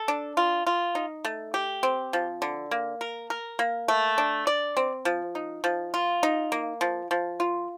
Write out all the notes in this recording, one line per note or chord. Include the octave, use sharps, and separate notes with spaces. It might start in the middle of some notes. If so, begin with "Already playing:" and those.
Already playing: A4
D4
F4
F4
D#4
A3
G4
C4
F3
D3
A#3
A#4
A#4
A#3
A3
D4
D5
C4
F3
D#4
F3
F4
D#4
A#3
F3
F3
F4